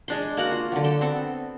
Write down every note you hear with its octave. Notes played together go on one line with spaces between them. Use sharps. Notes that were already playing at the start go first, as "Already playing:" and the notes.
G#3 D4 C6
A#3 F#4 F#5
F4
D3 F#3
A4 G5
B3 C4 A4